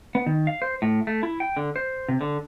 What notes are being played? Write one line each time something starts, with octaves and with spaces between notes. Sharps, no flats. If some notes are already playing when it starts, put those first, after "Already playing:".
B3
D#3
F5
C5
A2
A3
E4
G5
D3
C5
C3
D3